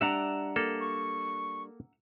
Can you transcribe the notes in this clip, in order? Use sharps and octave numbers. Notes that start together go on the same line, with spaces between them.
G3 D4 E5 F#5 A#5
A#3 A4
C#6